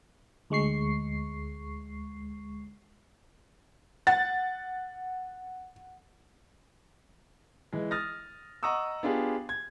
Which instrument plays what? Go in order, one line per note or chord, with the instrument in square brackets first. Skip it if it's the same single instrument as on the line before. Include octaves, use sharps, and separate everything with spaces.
[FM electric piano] D2 G#3 C#6 C7
[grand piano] F#5 [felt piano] A6
[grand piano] E3 G#3
D#6 F6 A6 A#6
D#5 F#5 A#5 C#6 D#6 E6
B3 D4 F4 G4 G#4
G#6